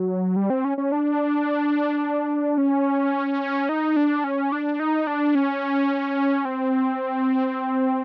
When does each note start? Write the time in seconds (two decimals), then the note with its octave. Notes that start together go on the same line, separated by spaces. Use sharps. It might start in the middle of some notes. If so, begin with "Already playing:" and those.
Already playing: F#3
0.36 G3
0.50 C4
0.65 C#4
0.78 C#4
0.92 D4
2.58 C#4
3.69 D#4
3.96 D4
4.24 C#4
4.52 D4
4.80 D#4
5.07 D4
5.35 C#4
6.45 C4